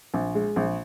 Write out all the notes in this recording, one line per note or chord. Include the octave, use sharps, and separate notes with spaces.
A#1
G#3
A#1